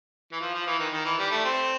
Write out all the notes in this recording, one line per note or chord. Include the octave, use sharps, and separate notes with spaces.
E3
F3
F3
E3
D#3
D#3
E3
G3
A3
C4